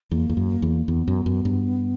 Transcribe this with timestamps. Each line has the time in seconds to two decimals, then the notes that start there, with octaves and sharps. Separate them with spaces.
0.11 E2 A#3
0.29 E2
0.37 F#2
0.62 E2
0.88 E2 B3
1.08 F#2
1.26 F#2
1.45 G2